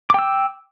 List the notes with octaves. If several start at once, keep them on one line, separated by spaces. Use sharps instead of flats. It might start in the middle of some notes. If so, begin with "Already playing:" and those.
G5 D6 E6